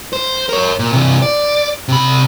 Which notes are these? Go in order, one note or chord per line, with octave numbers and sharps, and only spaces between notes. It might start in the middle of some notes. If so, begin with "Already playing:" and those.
C5
A#4 C#5
A#2
C3 E3
D5
C3 B5